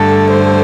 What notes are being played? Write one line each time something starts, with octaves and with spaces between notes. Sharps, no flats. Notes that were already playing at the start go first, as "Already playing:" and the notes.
Already playing: G2 D3 A3 A4
C5